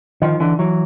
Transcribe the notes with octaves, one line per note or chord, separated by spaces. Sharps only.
D#3 F3
D3 E3
E3 F#3